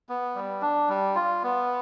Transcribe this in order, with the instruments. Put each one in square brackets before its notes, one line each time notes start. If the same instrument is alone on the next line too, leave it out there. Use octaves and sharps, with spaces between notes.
[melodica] B3
G3
D4
G3
F4
B3